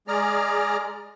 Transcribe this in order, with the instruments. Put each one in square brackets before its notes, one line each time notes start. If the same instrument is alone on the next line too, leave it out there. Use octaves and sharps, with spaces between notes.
[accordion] G#3 G#4 D5 A#5 F6